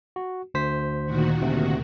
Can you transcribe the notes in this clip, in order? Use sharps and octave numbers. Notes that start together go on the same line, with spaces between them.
F#4
D2 C5 B6
A#2 D#3 F#4
D2 C3